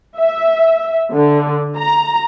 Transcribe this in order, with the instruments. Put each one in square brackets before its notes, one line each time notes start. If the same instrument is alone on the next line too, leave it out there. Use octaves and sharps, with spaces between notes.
[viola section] E5
D3
A#5